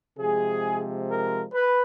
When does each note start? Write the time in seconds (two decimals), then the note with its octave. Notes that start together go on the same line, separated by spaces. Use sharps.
0.18 C3 F3 G#3 G#4
1.09 A#4
1.53 B4